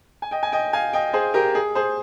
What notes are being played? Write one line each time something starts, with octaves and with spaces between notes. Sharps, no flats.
G#5
D#5 G5
G#5
D#5 G5
F5 G#5
D#5 G5
G#4 C5
G4 A#4
G#4
G#4 C5